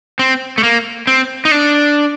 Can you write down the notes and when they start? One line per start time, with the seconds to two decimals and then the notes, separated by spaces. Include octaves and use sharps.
0.19 C4
0.58 A3
0.63 A#3
1.07 C4
1.45 D#4
1.51 D4